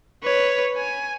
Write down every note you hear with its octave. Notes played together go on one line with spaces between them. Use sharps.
B4 C#5
G#5